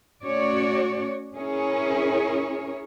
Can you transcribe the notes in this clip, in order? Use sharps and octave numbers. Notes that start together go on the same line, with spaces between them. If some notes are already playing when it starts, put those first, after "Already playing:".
A3 C#4 F#4 C#5 D5
C#4 E4 G#4 A#4 C#5